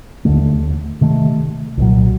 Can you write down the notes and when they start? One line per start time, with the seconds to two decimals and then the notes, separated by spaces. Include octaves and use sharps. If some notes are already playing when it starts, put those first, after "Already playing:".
0.25 D#2 D3 A3
1.01 C3 D#3 A3
1.77 C2 A#2 F#3